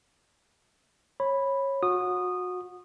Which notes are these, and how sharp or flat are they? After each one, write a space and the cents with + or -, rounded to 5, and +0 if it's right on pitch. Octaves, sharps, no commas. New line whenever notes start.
C#5 -20 B5 +0
F#4 -30 D#6 -15